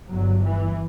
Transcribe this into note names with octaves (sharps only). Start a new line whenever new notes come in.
G1 G2 F#3
E3